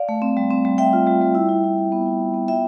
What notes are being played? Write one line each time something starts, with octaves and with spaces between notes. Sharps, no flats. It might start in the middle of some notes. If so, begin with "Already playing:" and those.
Already playing: D5 F5
A3
C4
G3
C4
G3
G3 E5 G5
F4
G3
G3
E4
E4
E4
E4
B3
E4
E4
B3
F4 E5 G5